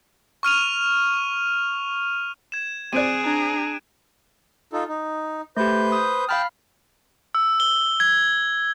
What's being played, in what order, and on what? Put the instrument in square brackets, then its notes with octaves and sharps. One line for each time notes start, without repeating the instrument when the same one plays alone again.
[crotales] C#6 F6 D#7 F7
G#6 E7
[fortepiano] C4 D5 [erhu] G#4 [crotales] F#6 D7 D#7
[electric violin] D4 A#5
[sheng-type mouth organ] D#4 F4 A4
D#4
[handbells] A3 G4 [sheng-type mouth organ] B4 C5 G6
[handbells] D#6
[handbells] F5 B5 F6 [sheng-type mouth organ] G5 A5
[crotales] E6
G7
G#6